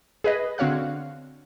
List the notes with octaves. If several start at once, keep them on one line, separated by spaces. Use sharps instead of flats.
G#4 B4 D#5
D3 C4 F#4 C#5 F5 F#6